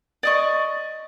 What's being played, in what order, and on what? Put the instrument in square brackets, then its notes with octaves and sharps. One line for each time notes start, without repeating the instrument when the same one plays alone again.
[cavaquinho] D5 D#5 C#6